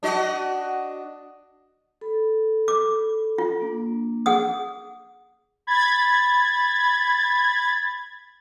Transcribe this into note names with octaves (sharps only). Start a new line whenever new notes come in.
D4 F#4 D#5
A4 B5
D6
F4
A#3 D4
G#4 F#5 D#6
B5 G#6 A6